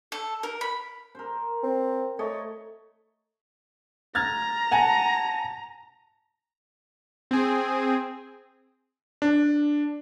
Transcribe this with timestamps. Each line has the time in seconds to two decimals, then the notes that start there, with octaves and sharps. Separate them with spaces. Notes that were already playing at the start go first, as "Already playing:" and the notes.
0.12 A4
0.43 A#4
0.61 B5
1.15 A#4 C5
1.63 C4
2.19 A3 C#5 D#5 A5
4.15 A#5 F6 G#6 A6
4.71 F#5 G#5 A5
7.31 C4 G#4
9.22 D4